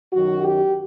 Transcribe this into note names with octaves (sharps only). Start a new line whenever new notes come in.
F#2 D#3 F#3 F#4
G4